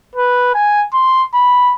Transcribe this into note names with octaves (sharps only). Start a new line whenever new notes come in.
B4
G#5
C6
B5